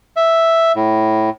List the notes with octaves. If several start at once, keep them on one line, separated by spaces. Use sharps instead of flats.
E5
A2